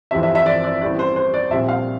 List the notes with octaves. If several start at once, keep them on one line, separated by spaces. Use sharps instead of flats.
G1 F2 E3 G3 C4 E5
E5
E5
D5
D5
A1 A2 G3 C4 E4 D5
C5
C5
D5
A#1 A#2 G3 C4 E5
F5